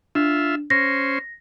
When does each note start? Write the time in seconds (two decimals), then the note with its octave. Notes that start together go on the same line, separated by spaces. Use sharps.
0.15 D4 F4 E5
0.70 C#4 C5 A#6